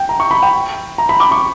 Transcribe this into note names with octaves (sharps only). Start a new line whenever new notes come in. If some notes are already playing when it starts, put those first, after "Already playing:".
Already playing: G5
A#5
C#6
B5
G5
A#5
B5
D6
C#6